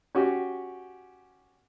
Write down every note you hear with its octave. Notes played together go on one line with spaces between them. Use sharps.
C#4 F#4 G4